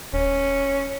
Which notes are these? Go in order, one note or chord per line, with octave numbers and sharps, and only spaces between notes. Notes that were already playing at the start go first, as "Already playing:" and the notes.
D#1 C#4